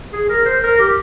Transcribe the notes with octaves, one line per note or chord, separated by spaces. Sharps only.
G#4
A#4
C5
A#4
G4